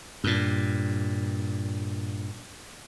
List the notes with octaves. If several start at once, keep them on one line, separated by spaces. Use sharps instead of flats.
G2 A#2